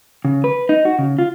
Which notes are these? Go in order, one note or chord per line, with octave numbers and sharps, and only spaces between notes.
C#3
B4
D#4
F#4
C#3
F4